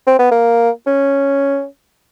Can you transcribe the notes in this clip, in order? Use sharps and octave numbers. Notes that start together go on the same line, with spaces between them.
C4
B3
A#3
C#4